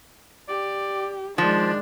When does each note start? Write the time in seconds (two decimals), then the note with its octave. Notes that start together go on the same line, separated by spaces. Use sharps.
0.49 G4 D5
1.38 D#3 F3 G#3 D4 D5